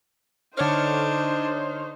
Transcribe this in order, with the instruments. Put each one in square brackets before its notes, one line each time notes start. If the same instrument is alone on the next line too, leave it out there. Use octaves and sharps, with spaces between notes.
[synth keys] D3 C#5 F6 [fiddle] D4 [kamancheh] D#4 C5